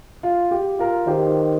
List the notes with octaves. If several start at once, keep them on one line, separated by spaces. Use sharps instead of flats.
F4
G4
F4 A#4
D#3 G4 C5